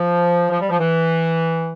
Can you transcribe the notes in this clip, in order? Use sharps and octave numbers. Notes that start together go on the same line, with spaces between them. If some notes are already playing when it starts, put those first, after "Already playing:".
Already playing: F3
F3
G3
F3
E3